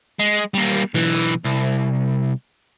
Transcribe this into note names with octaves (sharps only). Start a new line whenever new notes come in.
G#3
G3 A#3
B1 E3
C2